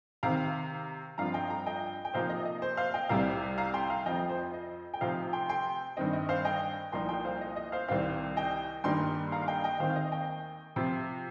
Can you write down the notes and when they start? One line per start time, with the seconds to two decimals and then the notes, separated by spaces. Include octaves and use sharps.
0.23 C3 D#3 C4 F5 A#5
1.18 G2 F3 C4 F4 F5 A#5
1.34 D#5 G5
1.50 F5 A#5
1.66 D#5 G5
2.05 G5
2.14 C3 F3 A#3 D#4 C5 F5
2.29 D#5
2.45 D#5
2.62 C5
2.77 C5 F5
2.94 D#5 G5
3.09 C2 C3 G3 C4 F5 A#5
3.58 F5 A#5
3.74 G5 C6
3.90 F5 A#5
4.06 F2 F3 C4 F4 D#5 G5
4.29 C5
4.42 D#5
4.53 D#5
4.94 G5
5.01 C3 F3 D#4 C5 F5
5.33 G5 C6
5.49 G5 C6
5.97 G2 D#3 C4 D#5
6.13 D#5
6.29 C5 F5
6.45 D#5 G5
6.92 C2 A#2 F3 D#4 G5 C6
7.09 G5 C6
7.25 C5 F5
7.41 D#5
7.56 D#5
7.72 C5 F5
7.88 C2 C3 D#3 C4 C5 F5
8.37 D#5 G5
8.84 G2 D#3 G3 A#3 D#4 G5 C6
9.28 C6
9.32 F5 A#5
9.42 F5
9.48 D#5 G5
9.64 D#5 G5
9.80 D#2 D#3 C4 C5 F5
9.90 F5
9.96 D#5
10.12 D#5 G5
10.76 C3 F3 C4 F4